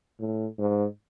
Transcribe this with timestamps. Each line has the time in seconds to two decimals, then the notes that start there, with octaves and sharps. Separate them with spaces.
0.20 A2
0.59 G#2